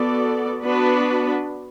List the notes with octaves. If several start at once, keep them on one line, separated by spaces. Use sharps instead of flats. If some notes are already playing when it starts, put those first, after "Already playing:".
Already playing: B3 F#4 A4 D5
B3 D4 F#4 B4